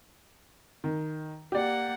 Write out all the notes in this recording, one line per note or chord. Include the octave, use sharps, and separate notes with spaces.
D#3
A#3 G4 D5 F#5